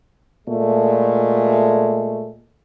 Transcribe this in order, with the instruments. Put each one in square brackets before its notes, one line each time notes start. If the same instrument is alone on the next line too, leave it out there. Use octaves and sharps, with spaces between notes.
[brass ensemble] A#2 G#3 A3